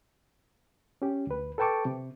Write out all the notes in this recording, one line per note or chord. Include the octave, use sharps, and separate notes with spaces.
C#4 G4
D2 B4
A4 B4 G5 A5 C#6 D6
C3